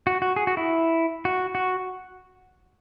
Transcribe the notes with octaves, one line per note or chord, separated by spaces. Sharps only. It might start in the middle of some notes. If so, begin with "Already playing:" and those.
F#4
F#4
G#4
F#4
E4
F#4
F#4